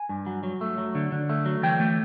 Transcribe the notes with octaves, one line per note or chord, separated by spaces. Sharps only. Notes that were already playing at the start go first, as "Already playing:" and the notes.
Already playing: G#5
G2
F#3
F#3
A3
F#3
D3
D3
A3
F#3
E3 G5
A3